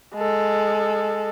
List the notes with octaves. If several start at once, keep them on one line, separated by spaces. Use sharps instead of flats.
G#3 A4